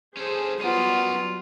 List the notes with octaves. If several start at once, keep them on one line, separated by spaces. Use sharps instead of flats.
C#4 G#4 A4 C5
F#3 G3 B3 C#4 F4 A#4